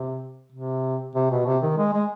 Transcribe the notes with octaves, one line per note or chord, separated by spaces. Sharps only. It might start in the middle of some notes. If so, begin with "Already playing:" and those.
Already playing: C3
C3
C3
B2
C3
D#3
G#3
G#3